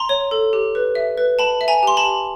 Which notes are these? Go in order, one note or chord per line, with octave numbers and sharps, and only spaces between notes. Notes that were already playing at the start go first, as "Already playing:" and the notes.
Already playing: A#5 C6
C#5
A4
G4
B4
E5
B4
G5 A5 B5
E5
G#5 A#5
G4 C6
A5 B5
G4